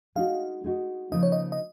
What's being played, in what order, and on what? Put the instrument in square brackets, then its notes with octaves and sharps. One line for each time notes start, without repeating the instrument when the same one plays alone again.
[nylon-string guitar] G#3 D#4 F#4 [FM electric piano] F5
[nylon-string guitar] G#3 D#4 F#4
[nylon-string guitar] C#3 F3 A#3 D#4 [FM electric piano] D#5
[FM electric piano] C#5
D#5
D#5